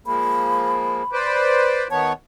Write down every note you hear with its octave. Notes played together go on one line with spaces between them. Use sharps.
F3 G#3 A#3 B5
B4 C5 D5
D#3 B3 C#5 A5